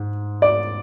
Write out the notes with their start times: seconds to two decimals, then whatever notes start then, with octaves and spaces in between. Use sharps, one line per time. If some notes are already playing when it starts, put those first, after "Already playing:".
Already playing: G#2
0.42 D5